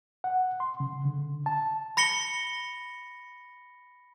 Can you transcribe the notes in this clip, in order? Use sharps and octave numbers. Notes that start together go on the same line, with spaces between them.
F#5
C6
C#3
D3
A5
B5 A#6 C#7 G7